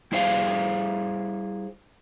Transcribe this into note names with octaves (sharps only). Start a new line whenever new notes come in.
G3 E4 G#4 C5 F5